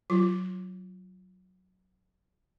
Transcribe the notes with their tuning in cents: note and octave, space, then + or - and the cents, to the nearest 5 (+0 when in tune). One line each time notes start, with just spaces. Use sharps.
F#3 +0 F4 -15